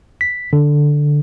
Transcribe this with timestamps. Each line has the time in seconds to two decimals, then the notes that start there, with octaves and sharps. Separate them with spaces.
0.21 B6
0.53 D3